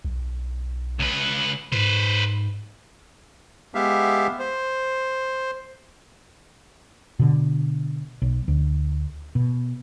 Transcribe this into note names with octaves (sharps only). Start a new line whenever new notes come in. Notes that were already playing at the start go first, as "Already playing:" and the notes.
B1
C#2 B4
G#2 B4 C5
G#3 B3 G4 E5 F5
C5
B2 D3
B1
D2
B2